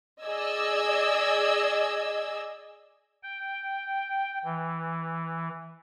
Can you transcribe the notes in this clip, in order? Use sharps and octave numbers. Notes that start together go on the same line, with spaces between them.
G#4 D5 D#5 E6 G#6
G5
E3